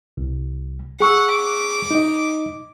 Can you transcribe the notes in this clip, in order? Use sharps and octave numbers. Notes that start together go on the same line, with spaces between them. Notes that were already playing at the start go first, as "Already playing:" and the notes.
C2
G#4 F#5 C#6 E6
D6
D#4 D#5